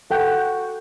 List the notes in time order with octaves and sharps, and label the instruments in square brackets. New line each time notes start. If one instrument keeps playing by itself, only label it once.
[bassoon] F#4 [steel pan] A4 F#5 G5